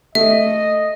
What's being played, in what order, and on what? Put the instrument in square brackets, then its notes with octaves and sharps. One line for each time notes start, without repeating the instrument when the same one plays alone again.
[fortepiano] A3 [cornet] D#5 [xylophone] E5